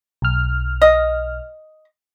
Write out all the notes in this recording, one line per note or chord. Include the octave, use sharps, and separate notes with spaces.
B1 F6
D#5